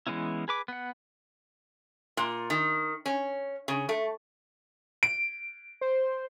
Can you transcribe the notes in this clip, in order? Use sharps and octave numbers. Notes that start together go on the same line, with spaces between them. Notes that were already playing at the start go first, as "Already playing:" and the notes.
E3 G#3 B3 C#4 E4
G#4 B4 D6
B3 F#5
A#2
D#3
C#4
C#3
A3
D7
C5